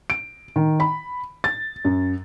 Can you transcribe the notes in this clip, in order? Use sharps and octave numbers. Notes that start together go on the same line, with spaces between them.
D7
D#3
B5
A6
F#2